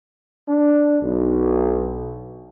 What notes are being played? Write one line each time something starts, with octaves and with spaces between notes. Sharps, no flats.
D4
B1